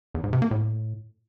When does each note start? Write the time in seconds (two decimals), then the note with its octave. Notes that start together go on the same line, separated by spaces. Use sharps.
0.14 E2
0.24 G#2
0.33 C3
0.42 A#3
0.51 A2